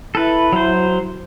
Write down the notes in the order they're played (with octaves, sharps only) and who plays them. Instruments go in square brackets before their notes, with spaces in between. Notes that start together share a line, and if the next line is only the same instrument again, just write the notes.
[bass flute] E4 [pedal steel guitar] A4 B4
[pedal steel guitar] F#3 C5